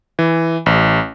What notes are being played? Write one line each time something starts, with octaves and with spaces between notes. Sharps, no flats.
E3
A1